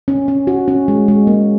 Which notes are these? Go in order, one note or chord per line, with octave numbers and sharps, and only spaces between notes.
C#4
C#4
F#4
C#4
G#3
G#3
A#3